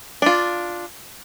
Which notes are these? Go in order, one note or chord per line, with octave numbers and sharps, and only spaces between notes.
D4 F4